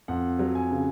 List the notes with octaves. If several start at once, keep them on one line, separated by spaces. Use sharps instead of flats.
F2 F#5
F#3
G#5
C#3